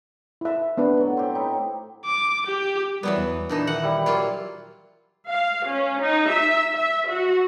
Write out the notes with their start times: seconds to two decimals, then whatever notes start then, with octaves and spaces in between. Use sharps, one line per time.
0.41 E4 E5
0.77 B3 D4 B4
0.97 A2 F#3
1.17 C4 G4
1.35 D#4 E4
2.05 D6
2.46 G4
3.03 E3 F#3 G3 B3
3.17 E2
3.49 A#2 E3 D4 D#4
3.67 D#3 E5 F#5
3.83 G3 E4
4.06 F#3 A#3 F4
5.29 F5
5.68 C#4
6.01 D#4
6.31 E5
6.76 E5
7.11 F#4